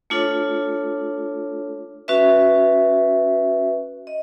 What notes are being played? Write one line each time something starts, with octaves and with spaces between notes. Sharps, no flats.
A3 D4 F4 A4 C#5
C#4 F#4 B4 E5
D#5